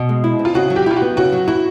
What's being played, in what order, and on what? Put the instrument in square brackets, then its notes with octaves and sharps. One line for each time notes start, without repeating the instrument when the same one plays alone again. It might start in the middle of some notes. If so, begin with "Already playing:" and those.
Already playing: [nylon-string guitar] B2
G#3
E4
C4
[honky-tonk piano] F4
[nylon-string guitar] C#3 [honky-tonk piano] F#4
[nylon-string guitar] F#3
[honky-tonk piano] G4
[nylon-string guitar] E4 [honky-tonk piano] F4
[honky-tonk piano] F#4
[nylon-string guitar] B3
[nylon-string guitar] C#3 [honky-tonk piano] F#4
[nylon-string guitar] F#3
[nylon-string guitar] E4 [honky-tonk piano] F#4